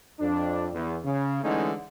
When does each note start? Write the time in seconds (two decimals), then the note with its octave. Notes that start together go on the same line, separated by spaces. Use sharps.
0.20 F2 D4
0.74 E2
1.04 C#3
1.43 D3 E3 G#3 A3 C#4 D#4